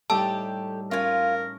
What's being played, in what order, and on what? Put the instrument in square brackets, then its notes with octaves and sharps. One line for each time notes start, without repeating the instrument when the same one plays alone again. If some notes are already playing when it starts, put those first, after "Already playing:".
[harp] A2 G3 D#4 [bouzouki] G4 A4 [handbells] A5
[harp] C#4 [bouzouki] F4 G#5 [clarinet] A#4